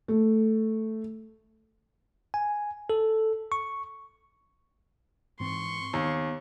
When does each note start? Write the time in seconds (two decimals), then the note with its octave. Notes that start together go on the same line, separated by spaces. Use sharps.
0.08 A3
2.34 G#5
2.90 A4
3.52 C#6
5.40 G#2 E3 C4 C6 C#6
5.93 D#2 B3